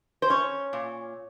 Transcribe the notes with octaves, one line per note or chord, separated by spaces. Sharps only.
C5
C#4 C#5
A#2